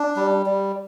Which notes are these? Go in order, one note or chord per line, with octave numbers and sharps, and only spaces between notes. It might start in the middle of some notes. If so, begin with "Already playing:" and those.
Already playing: D4
G3
G3